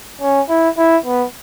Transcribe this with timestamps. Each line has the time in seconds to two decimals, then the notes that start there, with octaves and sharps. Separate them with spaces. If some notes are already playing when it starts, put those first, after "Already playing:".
0.21 C#4
0.49 E4
0.78 E4
1.05 B3